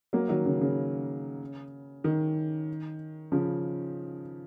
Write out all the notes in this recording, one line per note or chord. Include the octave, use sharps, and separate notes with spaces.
F#3 A#3
D#3 F#3
C#3
C#3
D#3
C#3 F3